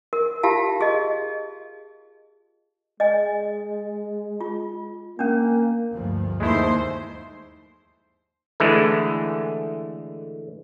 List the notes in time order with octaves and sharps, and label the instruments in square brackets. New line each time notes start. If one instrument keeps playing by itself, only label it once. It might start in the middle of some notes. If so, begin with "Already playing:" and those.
[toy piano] A#4
F4 G4 F5 A5
G#4 D#5
[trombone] G#3 [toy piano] D#5 G#5
[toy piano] F4
[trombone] A#3 [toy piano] C#4 D4
[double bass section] D2 G2 F3
[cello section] D#2 C5 [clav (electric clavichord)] G#3 A3 E4
[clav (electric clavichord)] D3 E3 G#3 A3